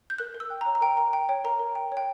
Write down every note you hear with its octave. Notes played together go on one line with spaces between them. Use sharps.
G6
A#4 F#6
A#4
E6
G5
A#5
C#5
A#5
A#4 G5
A#4 A#5
G5
C#5 G5
A#4 A#5
A#4
G5
C#5 G5